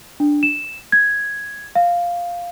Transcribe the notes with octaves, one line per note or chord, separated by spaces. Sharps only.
D4
E7
G#6
F5